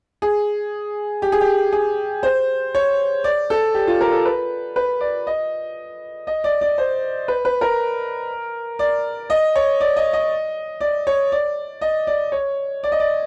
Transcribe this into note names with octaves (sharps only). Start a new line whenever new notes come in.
G#4
G4
G#4
G4
G#4
C5
C#5
D5
A4
G4
F4
A#4
A4
B4
B4
D5
D#5
D#5
D5
D5
C5
B4
B4
A#4
D5
D#5
C#5
D5
D#5
D#5
D5
C#5
D5
D#5
D5
C#5
D5
D#5
D5